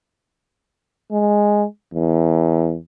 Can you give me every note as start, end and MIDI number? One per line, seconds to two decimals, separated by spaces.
1.11 1.65 56
1.94 2.77 40